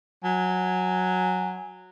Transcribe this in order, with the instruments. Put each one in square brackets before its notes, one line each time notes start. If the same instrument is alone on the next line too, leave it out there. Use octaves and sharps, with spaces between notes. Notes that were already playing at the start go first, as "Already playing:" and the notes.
[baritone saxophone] F#3 [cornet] G#5